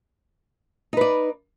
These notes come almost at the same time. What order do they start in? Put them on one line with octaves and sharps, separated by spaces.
D#4 B4 D5